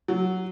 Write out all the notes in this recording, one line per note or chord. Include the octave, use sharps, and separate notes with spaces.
F#3